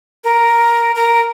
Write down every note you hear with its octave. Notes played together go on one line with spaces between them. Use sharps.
A#4
A#4